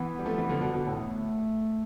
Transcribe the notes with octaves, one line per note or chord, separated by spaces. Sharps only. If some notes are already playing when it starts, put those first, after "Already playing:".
Already playing: E3 B3
G3
F3 A3
E3 G3
D3 F3
B2 D3
B2 D3
A2
A3